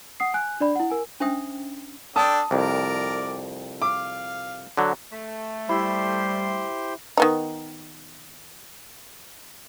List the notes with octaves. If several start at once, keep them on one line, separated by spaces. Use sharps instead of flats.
F#5 D#6 C7
G#5 F#6
D4 D5 B5
E4 F#5
A#4 G#5
C#4 D4 C5 E5 G5 D#6
D4 A4 G5 A5 D#6
C2 F2 A#4 D5
F5 D6
D3 F#3
A3
G3 E4 G4 C5 C6
D#3 B3 D#4